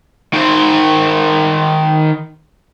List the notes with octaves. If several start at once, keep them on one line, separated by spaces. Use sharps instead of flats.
D#3 C5